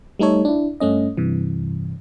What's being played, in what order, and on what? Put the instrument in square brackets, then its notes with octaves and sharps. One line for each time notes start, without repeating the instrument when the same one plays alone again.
[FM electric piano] G3 A3 D#4 A4 C#5
D4 E4
G2 A3 C#4 D#5
G2 C3 E3